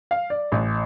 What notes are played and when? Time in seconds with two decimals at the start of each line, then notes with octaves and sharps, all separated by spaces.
0.11 F5
0.30 D5
0.52 A1